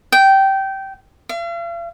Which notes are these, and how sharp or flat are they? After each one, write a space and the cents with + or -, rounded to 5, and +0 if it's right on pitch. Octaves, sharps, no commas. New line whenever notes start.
G5 -15
F5 -45